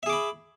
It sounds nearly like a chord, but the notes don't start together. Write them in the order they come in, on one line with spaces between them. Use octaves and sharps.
E5 G#4 D6 B5